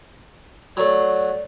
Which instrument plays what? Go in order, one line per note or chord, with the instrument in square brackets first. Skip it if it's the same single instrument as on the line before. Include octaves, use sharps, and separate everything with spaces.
[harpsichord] F#3 A3 [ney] D5